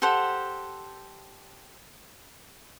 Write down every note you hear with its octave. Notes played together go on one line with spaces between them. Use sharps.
G4 A4 C5 F#5